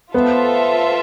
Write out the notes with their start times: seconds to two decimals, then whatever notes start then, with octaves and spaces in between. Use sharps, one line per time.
0.14 B3 F4 A4 C5 E5